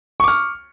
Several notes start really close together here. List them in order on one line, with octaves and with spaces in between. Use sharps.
C#6 D6 F6